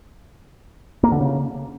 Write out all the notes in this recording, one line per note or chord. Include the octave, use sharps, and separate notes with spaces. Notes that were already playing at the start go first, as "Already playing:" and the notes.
A#3
D3
C#3